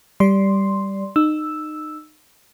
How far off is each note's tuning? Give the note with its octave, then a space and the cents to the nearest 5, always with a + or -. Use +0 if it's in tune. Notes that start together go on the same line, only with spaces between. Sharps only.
G3 +0 D5 -15 C6 +0
D#4 -25 E6 +0